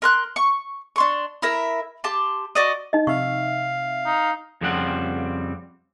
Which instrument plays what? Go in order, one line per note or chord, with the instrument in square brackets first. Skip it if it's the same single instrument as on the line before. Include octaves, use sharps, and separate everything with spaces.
[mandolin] A#4 C6 F#6
C#6
D4 C6 C#6
E4 A#4 E5
G4 A5 C6
F#4 D5 D#5
[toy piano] D#4 D#5
[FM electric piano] C3 E5 [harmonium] F5 [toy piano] C#6
[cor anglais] D#4
[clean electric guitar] F2 C#3 F3 G3 C4 F#5